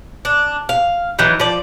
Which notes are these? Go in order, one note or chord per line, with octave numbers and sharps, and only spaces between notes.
D4
F5
E3 F#3 D#4
F3 D5